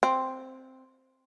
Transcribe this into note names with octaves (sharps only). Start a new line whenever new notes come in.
C4